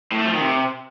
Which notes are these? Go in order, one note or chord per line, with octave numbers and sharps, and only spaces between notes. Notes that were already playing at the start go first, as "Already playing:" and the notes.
A2
A3
F3
D#3
C3